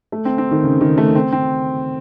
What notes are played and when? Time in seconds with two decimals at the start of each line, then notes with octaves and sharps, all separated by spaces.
0.12 A3
0.25 C4
0.38 C4
0.51 D#3
0.64 C#3
0.81 D#3
0.98 A3
1.15 C4
1.32 C4